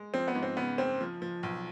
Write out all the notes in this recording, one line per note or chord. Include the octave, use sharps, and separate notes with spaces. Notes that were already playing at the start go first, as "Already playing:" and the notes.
Already playing: G#3
F3 C4
B3
G#2
C4
C#3 B3
F#1 C4
F3
F3
B1